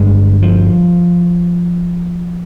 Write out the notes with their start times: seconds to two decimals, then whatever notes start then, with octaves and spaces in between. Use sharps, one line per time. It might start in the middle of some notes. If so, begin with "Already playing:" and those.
Already playing: G1 G2 G#3
0.42 F3